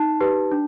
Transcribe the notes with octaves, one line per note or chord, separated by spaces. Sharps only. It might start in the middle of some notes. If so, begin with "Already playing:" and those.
Already playing: D#4 A5
G4 B4
D4